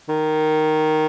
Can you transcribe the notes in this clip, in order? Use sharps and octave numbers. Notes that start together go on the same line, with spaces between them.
D#3